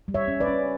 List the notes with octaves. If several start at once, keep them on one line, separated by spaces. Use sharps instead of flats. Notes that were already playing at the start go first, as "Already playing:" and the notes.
G3
C#5 E5
C#4
B4 D5
C#4